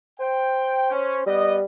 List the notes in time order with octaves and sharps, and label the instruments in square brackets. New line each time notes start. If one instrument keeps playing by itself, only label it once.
[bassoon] C5 [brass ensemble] G5
[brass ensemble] C#4
[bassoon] G3 [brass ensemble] B3 G4 D#5